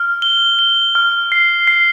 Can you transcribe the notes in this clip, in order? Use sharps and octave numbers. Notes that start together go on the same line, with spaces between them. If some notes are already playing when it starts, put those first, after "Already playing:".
Already playing: F6
G7
G7
F6
C7
C7